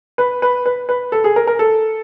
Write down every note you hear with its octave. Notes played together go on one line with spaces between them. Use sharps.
B4
B4
B4
B4
A4
G#4
A#4
A#4
A4